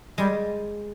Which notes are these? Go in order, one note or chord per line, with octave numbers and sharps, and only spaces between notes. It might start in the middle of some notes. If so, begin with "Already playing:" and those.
G3 G#3